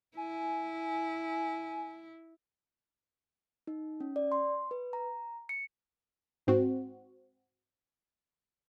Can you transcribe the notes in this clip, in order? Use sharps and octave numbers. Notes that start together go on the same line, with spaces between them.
E4 G#5
D#4
C#4
D5
C6
B4
A#5
C#7
G#2 C4 F#4